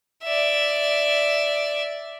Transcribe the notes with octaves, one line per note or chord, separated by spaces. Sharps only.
D5 E5